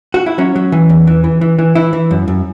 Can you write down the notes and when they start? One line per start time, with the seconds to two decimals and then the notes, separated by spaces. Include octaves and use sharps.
0.14 F#4
0.26 E4
0.38 F#3 C#4
0.56 F#3
0.72 E3
0.89 E2
1.07 E3
1.24 E3
1.41 E3
1.59 E3
1.75 E3 E4
1.93 E3
2.11 F#2
2.28 F#2